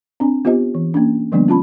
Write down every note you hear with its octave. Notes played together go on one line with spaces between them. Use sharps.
C4 D4 G#5
B3 F4 G4 C5 D#5
E3
A#3 C#4 D4
D3 F3 G3 A#3 B3 D4
C#4 F4 A5 B5